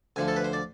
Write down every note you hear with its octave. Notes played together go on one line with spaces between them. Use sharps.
D2 D3 F3 G#5
A4
B4
C5
D5